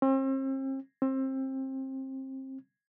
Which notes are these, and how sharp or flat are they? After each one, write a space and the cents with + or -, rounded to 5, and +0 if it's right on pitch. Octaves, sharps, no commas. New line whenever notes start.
C4 +40
C4 +25